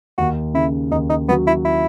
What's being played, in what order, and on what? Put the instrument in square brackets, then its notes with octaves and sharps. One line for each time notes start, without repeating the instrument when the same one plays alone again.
[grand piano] D#2 [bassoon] F#4
[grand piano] C#3 [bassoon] E4
[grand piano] D#2 [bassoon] D#4
[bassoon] D#4
[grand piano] F#3 [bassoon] B3
[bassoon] E4
E4